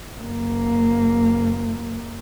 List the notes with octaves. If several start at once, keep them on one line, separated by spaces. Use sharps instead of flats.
F#1 A#3